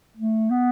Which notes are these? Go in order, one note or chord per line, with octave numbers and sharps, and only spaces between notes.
A3
B3